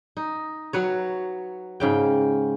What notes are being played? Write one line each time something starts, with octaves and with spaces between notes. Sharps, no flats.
D#4
F#3 B4 C#5
G#2 C#3 G5